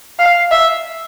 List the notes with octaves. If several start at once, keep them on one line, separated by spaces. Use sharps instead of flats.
F5
E5